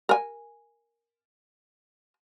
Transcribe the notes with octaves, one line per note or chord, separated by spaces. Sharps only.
A#4 G#5